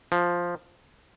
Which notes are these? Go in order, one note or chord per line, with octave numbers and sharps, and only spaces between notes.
F3